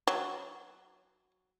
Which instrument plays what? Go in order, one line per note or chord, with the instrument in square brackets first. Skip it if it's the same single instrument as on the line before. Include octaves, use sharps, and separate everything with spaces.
[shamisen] F#3